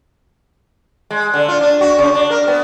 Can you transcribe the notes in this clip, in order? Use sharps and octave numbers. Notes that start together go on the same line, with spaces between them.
G#3
D3
F4
D4
F#4
C#3
D4
A#4
B3